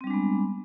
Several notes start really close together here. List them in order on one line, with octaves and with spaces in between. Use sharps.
C4 G3 D4 G#3 B3